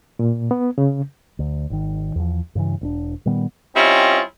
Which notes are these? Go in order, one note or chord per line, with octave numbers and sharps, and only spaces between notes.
A#2
B3
C#3
D2
G#1 D#3
E2 F3
G2 C#3 E3
E1 C4 D4
A#2 D#3 G3 B3
G3 C4 C#4 E4 F4 D#5